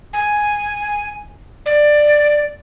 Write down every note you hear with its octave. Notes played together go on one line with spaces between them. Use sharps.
G#5
D5